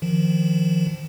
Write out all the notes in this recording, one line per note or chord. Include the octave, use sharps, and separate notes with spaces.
D#3 F3